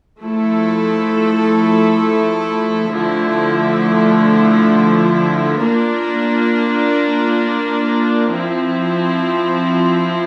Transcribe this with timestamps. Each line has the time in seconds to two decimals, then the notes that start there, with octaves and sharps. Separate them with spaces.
0.20 F3 A3 E4 A4
2.91 D3 F3 A3 E4
5.61 A#3 D4 F4 A#4
8.33 F3 C4 E4